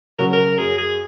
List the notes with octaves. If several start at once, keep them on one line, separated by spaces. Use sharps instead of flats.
C#3 F#3 C#4 F#4 A#4
A#4
F#2 G#4
G#4